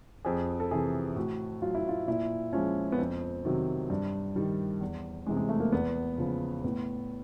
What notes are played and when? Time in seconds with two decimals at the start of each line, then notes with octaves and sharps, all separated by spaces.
0.25 F2 G#4
0.60 A4
0.71 C3 E3 G#4
1.16 A2 F#4
1.62 F#3 F4
1.75 E4
1.89 F4
2.08 A#2 E4
2.53 F3 G#3 C#4
2.92 B3
2.98 F2 C4
3.45 C3 D#3 F#3
3.90 G2
4.36 D#3 G3
4.81 E2
5.26 C3 E3 G#3
5.37 G#3
5.49 A3
5.60 A#3
5.72 E2 B3
6.18 C#3 F3
6.64 A2 B3